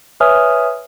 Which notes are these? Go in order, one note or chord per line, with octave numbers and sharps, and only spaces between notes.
B4 C#5 E5 G#5 D#6 F6